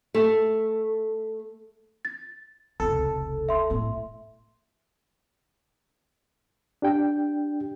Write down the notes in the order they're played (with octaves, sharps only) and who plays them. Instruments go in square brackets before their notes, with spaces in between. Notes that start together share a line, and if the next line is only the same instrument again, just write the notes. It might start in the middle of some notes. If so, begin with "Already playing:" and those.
[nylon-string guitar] A3
[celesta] A6
[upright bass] F1 C#2 [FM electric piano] A4
[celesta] E5 C6
[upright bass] A2 A3
[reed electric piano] D4 G4 G5